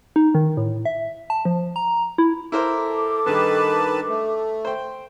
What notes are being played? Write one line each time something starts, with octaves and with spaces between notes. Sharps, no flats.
D#4
D#3
A2
E5
A5
F3
A#5
E4
E4 A4 A#4 C5 D6
G2 D#3 G#4 B4 A5
A3
C5 G5